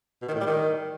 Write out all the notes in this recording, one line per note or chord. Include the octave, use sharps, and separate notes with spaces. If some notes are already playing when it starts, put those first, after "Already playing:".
B2
D#3
A2
G3
D#3